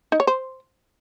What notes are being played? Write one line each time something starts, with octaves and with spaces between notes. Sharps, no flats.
D#4
C#5
C5